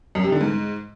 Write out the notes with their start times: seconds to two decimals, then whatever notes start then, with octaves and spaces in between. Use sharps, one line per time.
0.15 F#2
0.24 C3
0.32 D3
0.41 G#2